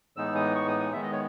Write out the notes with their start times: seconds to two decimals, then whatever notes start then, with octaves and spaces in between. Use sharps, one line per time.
0.17 A2 E3 G#3 B3 D#4 E6
0.35 D#6
0.56 C#6
0.68 D#6
0.80 D#6
0.93 D#3 G#3 B3 E5
1.03 D#5
1.12 C#5